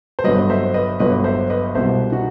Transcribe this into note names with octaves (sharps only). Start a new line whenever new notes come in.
C5
G1 G2 F#3 B4 D#5
C5 E5
B4 D#5
G1 G2 F#3 B4 D#5
C5 E5
B4 D#5
C2 B2 G3 C5 E5
D#4 F#4